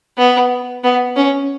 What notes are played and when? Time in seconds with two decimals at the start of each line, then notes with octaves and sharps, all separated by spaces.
0.18 B3
0.83 B3
1.16 C#4